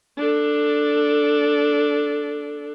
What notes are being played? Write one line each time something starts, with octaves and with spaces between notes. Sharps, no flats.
D4 A4